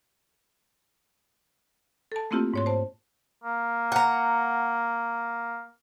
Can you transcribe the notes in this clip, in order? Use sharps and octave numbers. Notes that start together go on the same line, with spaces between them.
A4 A5
A3 A#3 C4 E4 F4 G4
G#2 C#5 C6
C5 A5
A#3
F#5 A#5